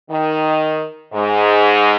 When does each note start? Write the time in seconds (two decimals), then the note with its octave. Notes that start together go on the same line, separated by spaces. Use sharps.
0.10 D#3
1.14 G#2